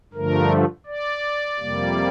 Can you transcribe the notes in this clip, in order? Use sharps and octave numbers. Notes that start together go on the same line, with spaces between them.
G2 D3 F3 A3 A#4
D5
F2 C3 G3 A#3